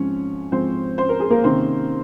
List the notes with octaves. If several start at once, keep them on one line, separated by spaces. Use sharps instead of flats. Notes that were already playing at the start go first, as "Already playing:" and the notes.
Already playing: G#2 F3 C4 C#4
G#2 F3 C4 C5
C5
A#4
G#4
A#3 A#4
C3 D#3 A#3 C4 C#4 C5